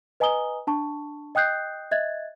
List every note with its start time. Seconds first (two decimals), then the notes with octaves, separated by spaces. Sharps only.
0.20 B4 D#5 G#5 A#5 D#6 G7
0.67 D4 A5 C#6
1.35 D#5 G5 D#6 F#6 G6 C7
1.91 D#5 E5 F#6 G#6 A6